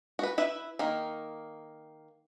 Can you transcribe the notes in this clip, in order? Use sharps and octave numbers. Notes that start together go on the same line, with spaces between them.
F#4 B4
E4 B4 E5
D#3 A#3